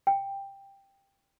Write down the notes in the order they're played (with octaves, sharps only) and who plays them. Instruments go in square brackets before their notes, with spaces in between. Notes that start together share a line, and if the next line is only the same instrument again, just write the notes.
[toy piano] G5